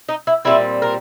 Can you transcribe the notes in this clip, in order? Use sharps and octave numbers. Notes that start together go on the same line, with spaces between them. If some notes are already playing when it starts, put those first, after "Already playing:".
D#4
E4
A#2 G3 C4 E4
A#4